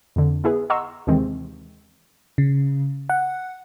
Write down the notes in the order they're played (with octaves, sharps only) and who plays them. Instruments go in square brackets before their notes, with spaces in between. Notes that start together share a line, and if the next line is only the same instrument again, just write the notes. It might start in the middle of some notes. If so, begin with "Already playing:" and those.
[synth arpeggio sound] F2 D3
B3 E4 G#4 B4
D#5 F#5 A#5 C6 C#6 E6
D#2 C3 D#3 E3 G#3 C4
[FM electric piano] C#3
F#5